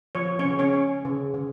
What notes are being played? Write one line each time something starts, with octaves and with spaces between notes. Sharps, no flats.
F3 C#5
C#4 C#5
C#3
C#4 C#5
C#4
C#3
C#3